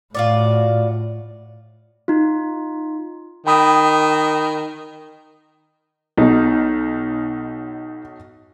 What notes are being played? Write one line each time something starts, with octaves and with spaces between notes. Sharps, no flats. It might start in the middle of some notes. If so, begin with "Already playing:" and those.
A2 F4 F#4 D5
D#4 F4
D#3 G5 B5 D#6
B1 B2 D#4